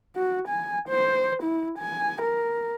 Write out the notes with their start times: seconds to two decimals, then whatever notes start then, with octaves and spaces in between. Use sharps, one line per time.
0.16 F#4
0.48 G#5
0.89 C5
1.43 E4
1.79 G#5
2.22 A#4